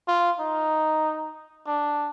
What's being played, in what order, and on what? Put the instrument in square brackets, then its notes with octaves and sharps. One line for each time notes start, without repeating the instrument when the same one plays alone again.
[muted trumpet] F4
D#4
D4